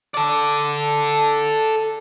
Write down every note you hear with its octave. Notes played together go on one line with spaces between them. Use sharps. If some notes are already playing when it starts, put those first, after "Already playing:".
A4 D5